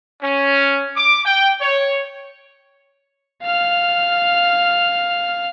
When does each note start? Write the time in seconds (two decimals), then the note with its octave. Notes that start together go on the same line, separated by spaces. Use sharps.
0.22 C#4
0.96 D6
1.24 G5
1.60 C#5
3.43 F5 F6